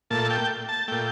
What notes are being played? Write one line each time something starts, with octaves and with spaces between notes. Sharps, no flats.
A#2 A3 A5
G5
A5
A#2 A3 G5